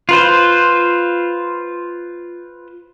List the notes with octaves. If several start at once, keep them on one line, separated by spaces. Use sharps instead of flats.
F4 B4 C5